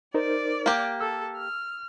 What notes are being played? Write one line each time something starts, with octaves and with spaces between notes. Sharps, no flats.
D#4 A#4 C5 D5
A#3 G4
A4 E6
F6